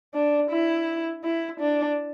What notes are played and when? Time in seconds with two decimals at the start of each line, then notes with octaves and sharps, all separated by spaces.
0.14 D4
0.50 E4
1.24 E4
1.60 D4